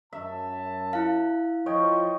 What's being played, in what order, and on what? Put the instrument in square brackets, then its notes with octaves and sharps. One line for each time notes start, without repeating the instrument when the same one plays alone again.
[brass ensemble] F#2 A5 [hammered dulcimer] E5
[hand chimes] E4 F5
[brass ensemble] F3 [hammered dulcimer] C#5 D#5 G5